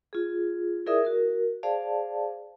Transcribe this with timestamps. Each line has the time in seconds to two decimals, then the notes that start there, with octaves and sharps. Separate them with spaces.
0.13 F4 G#4
0.86 E4 G#4 A#4 D5 E5 D#6
1.05 F#4 A#4
1.63 G#4 C5 D5 F5 A5